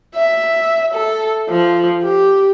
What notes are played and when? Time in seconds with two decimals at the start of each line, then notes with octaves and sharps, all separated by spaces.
0.15 E5
0.94 A4
1.49 F3
2.03 G4